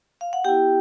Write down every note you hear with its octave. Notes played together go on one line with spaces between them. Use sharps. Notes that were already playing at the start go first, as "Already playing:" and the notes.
F5
F#5
B3 E4 G4 G5